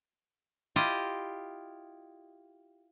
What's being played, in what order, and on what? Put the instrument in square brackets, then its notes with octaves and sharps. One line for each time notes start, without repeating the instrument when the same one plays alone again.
[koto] E4 F4 G4 D#5